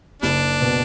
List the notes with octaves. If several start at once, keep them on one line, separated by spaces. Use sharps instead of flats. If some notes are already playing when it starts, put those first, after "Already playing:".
F#1 G3 D4
B2